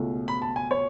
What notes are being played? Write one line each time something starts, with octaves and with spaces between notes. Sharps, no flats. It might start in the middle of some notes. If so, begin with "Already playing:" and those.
Already playing: C#2 B2 A3
B5
A5
G#5
C#5